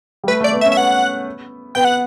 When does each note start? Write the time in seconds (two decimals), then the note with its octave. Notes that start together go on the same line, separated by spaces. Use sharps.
0.24 G3
0.27 A3 B4
0.41 A3 D5
0.53 B3
0.61 E5
0.65 C#4
0.72 E5
0.77 B3 F#5
1.75 B3 G5
1.85 F#5